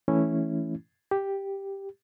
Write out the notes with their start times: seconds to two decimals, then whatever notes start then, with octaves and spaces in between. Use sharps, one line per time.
0.08 E3 A3 C#4 E4
1.11 G4